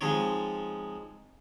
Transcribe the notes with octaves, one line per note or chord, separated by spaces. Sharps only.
F3 G#3 C4 D#4 C#5